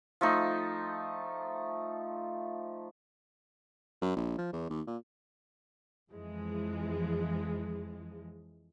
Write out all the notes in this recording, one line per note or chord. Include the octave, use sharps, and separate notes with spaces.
F3 A3 D#4
F#2
A#1
F3
E2
D#2
A#2
F2 E3 F3 G#3